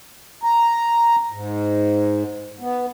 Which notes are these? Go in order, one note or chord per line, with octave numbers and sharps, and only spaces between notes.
A#5
G#2
B3